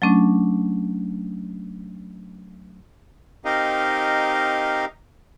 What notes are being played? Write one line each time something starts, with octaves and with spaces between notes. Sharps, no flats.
F#3 A3 C#4 D4
C4 D#4 G4 A#4 D#5 F5